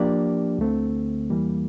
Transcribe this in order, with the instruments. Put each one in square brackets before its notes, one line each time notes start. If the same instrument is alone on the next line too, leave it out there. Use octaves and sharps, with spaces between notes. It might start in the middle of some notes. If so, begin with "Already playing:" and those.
Already playing: [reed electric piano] F3 A#3 D4 G4 D5
D2 D3 A3 C4
E2 E3 G3 A#3